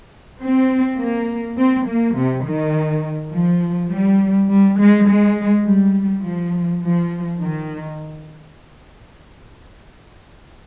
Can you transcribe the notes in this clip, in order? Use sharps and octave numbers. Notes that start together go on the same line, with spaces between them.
C4
A#3
C4
A#3
C3
D#3
F3
G3
G3
G#3
G#3
G3
F3
F3
D#3